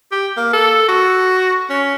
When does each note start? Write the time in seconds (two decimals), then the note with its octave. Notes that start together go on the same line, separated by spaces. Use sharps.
0.12 G4
0.37 A#3
0.53 A4
0.88 F#4
1.70 C#4